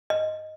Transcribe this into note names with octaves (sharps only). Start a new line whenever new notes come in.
D#5